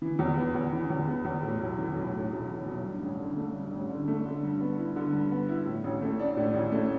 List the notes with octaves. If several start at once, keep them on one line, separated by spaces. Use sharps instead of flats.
E3
E2
B3
E2
E3
E2
B3
E2
A2
B1
E3
B1
A2
B1
E3
B1
G2
A1
D3
A3
G2
A1
D3
A3
D3
G2
B3
E4
D3
G2
B3
E4
A2
A1
A3
D4
A2
A1
A3